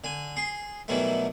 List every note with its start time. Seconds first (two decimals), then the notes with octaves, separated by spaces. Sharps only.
0.04 D3 G#5
0.37 G#4 C6
0.88 B2 D#3 E3 F#3 G3 A3